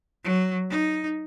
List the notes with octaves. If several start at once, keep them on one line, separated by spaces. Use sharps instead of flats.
F#3
D#4